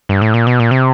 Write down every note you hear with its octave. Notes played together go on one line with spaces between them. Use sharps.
G2
A2
A#2
B2
A#2
C3